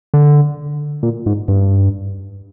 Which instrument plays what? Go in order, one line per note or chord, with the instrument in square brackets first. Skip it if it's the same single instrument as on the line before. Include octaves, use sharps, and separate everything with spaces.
[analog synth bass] D3
A#2
G#2
G2